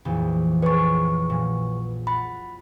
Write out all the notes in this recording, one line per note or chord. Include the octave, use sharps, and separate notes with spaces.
A#1 F2 E3
G#4 B4 C#5 C#6
A#2 F#3
F#5 B5 A6